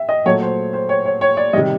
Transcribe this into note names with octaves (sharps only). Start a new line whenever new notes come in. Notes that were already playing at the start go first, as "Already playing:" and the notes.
Already playing: E5
D#5
A#2 F#3 A3 C#5
C5
C5
C#5
C#5
C#5
D5
C3 D#3 G3 D#5